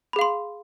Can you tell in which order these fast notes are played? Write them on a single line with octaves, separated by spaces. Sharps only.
B5 G#4 F5 C6